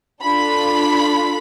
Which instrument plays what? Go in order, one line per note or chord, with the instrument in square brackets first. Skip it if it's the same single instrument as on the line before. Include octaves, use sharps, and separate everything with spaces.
[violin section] D4 F4 A4 B5